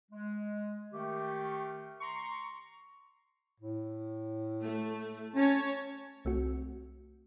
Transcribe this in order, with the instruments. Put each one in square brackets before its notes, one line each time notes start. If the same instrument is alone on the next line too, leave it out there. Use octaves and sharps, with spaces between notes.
[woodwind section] G#3
D#3 A3 G4
A#5 C6 C#6
[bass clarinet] A2
[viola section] A3
[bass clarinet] C#4 [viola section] C#5 A5
[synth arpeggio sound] C2 A3 C4 F#4